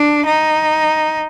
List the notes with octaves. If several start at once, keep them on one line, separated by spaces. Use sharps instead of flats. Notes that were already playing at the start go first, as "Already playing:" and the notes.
Already playing: D4
D#4